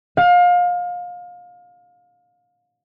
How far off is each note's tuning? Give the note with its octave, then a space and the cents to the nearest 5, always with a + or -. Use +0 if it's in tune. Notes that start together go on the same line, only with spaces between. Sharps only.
F5 +30